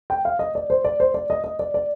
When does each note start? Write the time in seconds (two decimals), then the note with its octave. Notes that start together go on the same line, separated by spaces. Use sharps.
0.10 G5
0.25 F5
0.39 D#5
0.55 D5
0.70 C5
0.84 D5
1.00 C5
1.14 D5
1.30 D#5
1.44 D#5
1.59 D5
1.74 D5